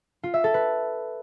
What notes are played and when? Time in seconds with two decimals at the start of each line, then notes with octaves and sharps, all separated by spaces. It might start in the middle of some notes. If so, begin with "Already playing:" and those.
0.23 F4
0.34 E5
0.44 A4
0.54 B4